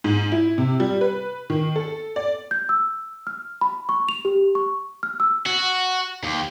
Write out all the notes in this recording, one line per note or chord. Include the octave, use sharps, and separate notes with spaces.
G#2
E4
C3
G3
B4
D#3
A4
D5
G6
E6
F6
B5
C#6
F7
G4
C#6
F6
E6
F#4
D#2